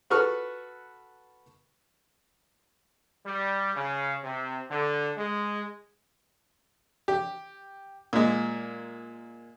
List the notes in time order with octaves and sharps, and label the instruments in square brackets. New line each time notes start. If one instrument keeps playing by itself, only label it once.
[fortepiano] F#4 A4 B4 B5 C#6 F6
[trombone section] G3
C#3
C3
D3
G#3
[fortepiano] G4
A#2 G#3